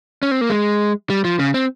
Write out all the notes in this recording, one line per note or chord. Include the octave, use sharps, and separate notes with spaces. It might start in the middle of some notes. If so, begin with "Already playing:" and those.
C#4
C4
A#3
G#3
G3
F3
C#3
C4